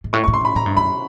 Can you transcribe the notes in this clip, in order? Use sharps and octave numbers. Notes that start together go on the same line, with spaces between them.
G#2
A2 C#6
C#6
A2
C6
A2 B5
A2 A#5
G2
F#2 B5